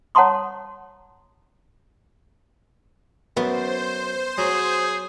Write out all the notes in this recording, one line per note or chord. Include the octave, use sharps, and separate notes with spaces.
C#5 F#5 A5 A#5 C6 D#6
F#2 B3 C5
F#3 G#4